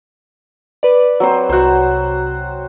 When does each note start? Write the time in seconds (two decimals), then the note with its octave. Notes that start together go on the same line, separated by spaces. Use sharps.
0.83 B4 D5
1.20 F#3 C4 C5
1.49 C2 C3 F#4 C5 F#5